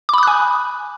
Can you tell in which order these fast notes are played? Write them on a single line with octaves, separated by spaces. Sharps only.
D6 B5 D#6 F#6 G#5